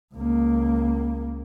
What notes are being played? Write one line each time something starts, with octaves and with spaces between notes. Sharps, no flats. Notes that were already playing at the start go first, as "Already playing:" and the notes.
C#2 A#3